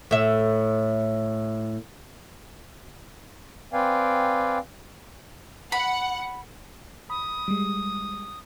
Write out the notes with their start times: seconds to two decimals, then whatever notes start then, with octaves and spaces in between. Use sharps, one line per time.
0.11 A2 E5
3.73 C4 B4 D5 F5 G5 G#5
5.72 F#5 B5
7.10 B5 D#6
7.48 G3 G#3